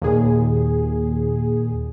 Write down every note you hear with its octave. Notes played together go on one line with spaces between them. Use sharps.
D#2 A#2 G#4